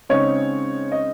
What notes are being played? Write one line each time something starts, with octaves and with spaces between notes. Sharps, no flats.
C#3 G#3 C4 D#4 C#5
D#5